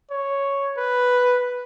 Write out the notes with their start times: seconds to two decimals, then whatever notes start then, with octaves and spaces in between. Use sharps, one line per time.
0.11 C#5
0.77 B4